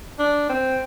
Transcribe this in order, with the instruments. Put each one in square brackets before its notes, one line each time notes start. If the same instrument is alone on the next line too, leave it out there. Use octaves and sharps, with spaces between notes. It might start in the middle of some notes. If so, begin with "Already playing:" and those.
[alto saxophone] D4
C4